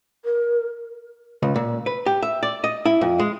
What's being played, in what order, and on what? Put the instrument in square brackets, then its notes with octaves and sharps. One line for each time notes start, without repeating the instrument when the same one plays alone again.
[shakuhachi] A#4
[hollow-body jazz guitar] C#2
A#2
B4
G4
E5
D5
D#5
E4
F2
G#3